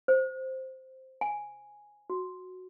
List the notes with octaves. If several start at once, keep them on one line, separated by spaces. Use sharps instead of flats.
C5
G#5
F#4